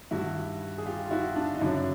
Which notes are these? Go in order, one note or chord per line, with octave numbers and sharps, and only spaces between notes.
G2 D#3 G3 E4 F#4
G#4
F4 G4
F4
E4 F#4
D4
D#4
F#2 C#3 F#3 D4 E4